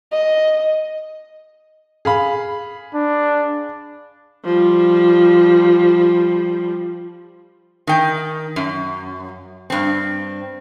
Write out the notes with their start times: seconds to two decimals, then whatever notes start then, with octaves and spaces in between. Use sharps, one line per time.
0.12 D#5
2.05 G#4 F5 B5
2.94 D4
4.45 F3 G3
7.87 D#3 G5
8.56 F#2
9.70 G2 C4